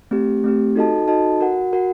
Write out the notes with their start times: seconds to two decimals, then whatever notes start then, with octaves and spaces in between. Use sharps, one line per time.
0.11 A3 C4 G4
0.44 A3 C4 G4
0.76 D#4 F#4 A4 D#5 A5
1.07 D#4 F#4 A4 D#5 A5
1.41 F#4 A#4 F#5
1.73 F#4 A#4 F#5